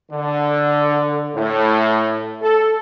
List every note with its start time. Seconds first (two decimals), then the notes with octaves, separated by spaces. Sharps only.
0.11 D3
1.34 A2
2.42 A4